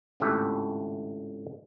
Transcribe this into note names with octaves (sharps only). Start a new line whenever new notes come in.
G#1 C#2 A2 A3 G4 E5